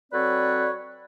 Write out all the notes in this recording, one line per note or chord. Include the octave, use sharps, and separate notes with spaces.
F#3 C4 A4 B4 C#5 D5